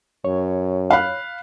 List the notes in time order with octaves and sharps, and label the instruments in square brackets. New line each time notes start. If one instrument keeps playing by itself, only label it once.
[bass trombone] F#2 [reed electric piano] C#5
[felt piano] F5 B5 F#6